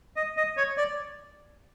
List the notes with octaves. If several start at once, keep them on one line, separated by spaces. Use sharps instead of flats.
D#5
D#5
C#5
D5